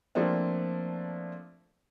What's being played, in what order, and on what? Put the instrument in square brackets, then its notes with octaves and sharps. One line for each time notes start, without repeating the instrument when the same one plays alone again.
[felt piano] F3 A3 A#3 C4 D4